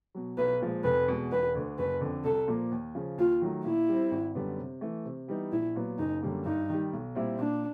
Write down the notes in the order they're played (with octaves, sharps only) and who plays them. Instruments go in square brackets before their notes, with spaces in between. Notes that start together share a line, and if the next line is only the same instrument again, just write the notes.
[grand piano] B2 F#3
[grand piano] B1 [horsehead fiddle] B4
[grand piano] A#2 F3 G#3
[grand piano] F1 [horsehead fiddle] B4
[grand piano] E2 B2 G#3
[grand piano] E1 [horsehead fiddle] B4
[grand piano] D2 D3
[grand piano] F#1 [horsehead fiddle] B4
[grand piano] F2 D3
[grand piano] C2 [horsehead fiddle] A4
[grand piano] A#2 F3 A#3
D#2
C#3 F3
[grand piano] D#2 [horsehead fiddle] F4
[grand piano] D#3 F#3 A3
[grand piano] A#2 [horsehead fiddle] E4
[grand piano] G3 C4
G#1
F#2 D3 G3 B3
C3
E3 A3
C3
E3 G3 B3 D#4
[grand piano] A#1 [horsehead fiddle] E4
[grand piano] A#2 F#3 B3
[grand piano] F#1 [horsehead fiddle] D#4
[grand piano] F#2 D3 G3 A#3
[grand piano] G2 [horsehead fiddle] D#4
[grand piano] D#3 G3
B1
A#2 G3 C4 E4
[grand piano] A#2 [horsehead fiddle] D4